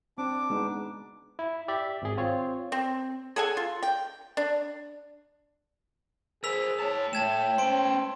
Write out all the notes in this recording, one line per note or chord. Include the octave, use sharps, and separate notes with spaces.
C4 D4 D6
G#3 B3 D#4
E4
G4 D5 E5
G#1 G#4
C4 F4 C#5
C4
G#4 A4 F#5 G#5
F4
G5
D4
G#4 A#4 C5 E6 B6 F7
C#5 A5
A2 A3 G5 A5 G#6 E7
C#4 C5 C6 D7